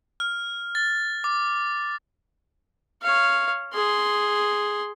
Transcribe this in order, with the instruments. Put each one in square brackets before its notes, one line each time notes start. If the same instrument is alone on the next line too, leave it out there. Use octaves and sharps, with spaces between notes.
[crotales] F6
A6
D6
[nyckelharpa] C#5 F5
G#4 C6